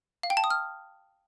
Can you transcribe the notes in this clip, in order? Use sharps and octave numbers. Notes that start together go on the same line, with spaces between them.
F5
G5
A5
D#6
F6